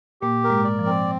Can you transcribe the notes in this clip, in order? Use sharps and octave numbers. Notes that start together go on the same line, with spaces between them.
A#2 A#3 G4
A#4
G#2 G#3
D5
F3
C4